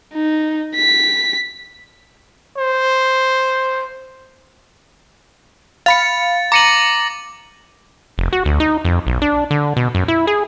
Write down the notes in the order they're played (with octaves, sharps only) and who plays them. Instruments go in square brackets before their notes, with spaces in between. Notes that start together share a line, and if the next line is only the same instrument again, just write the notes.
[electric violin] D#4
B6
[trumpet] C5
[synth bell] F5 B5 C#7 [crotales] A6
[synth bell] A#5 C#7 D#7 [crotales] D6 A#6 F#7
[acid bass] F1
F#4
D2
D#4
F2
B1
D4
D3
B2
F#2
E4
G#4